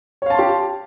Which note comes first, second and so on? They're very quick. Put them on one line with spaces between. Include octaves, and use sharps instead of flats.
C#5 F5 A5 C6 G4